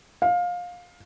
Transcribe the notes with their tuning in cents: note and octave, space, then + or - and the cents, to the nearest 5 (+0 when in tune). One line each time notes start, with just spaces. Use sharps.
F5 +20